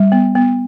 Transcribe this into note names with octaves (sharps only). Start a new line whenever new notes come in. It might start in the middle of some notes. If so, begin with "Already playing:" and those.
Already playing: G3
B3
B3